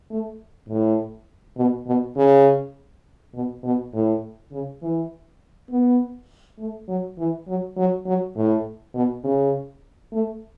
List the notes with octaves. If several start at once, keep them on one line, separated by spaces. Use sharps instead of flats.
A3
A2
B2
B2
C#3
B2
B2
A2
C#3
E3
B3
A3
F#3
E3
F#3
F#3
F#3
A2
B2
C#3
A3